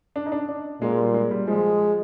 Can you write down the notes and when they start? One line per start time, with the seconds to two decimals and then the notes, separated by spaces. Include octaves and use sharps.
0.16 D4
0.26 D#4
0.32 D4
0.49 D4
0.82 A#2 G#3
0.98 G3
1.14 G#3
1.31 G3
1.48 F3 G#3